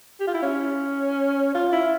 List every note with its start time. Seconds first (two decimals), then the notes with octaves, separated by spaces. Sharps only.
0.20 G4
0.27 F4
0.34 E4
0.42 C#4
1.54 F4
1.72 E4